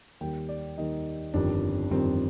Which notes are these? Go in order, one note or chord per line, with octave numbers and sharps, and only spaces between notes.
D#2 D#3 G3 G5
D5
D#2 D#3 G3 D#4
G1 F2 D#3 G3 D4
G1 F2 D#3 G3 C4